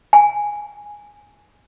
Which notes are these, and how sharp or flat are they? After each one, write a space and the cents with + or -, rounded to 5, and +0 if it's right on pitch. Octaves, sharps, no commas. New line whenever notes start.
G#5 -5